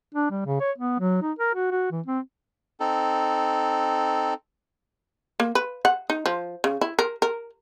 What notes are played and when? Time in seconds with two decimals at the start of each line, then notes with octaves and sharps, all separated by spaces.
0.15 D4
0.31 G3
0.46 C#3
0.60 C#5
0.78 B3
1.00 F#3
1.22 D#4
1.39 A#4
1.55 F#4
1.71 F#4
1.91 E3
2.06 C4
2.80 C4 D#4 A4
5.40 A#3
5.55 B4
5.85 F#5
6.10 D#4
6.26 F3
6.64 C#3
6.81 E4
6.99 A#4
7.22 A#4